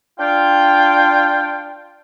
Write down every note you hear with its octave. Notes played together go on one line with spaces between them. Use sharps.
D4 F4 G5